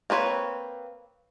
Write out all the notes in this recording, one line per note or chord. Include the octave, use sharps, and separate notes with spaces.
A#3 C4 B4 C#5